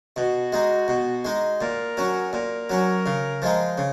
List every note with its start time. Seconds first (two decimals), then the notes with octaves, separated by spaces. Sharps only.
0.16 B2 F#4
0.53 G#3 D#4
0.88 B2
1.25 G#3 D#4
1.61 A#2 A#4
1.97 F#3 C#4
2.33 A#2 A#4
2.70 F#3 C#4
3.06 C#3
3.42 F3 G#3 D#4
3.78 C#3